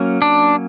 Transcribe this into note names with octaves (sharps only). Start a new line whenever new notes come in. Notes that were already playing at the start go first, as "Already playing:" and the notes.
Already playing: F#3 A#3 C#4
D4